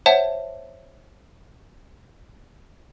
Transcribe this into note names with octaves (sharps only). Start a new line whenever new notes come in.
C5 C#5 E5 F#5 A5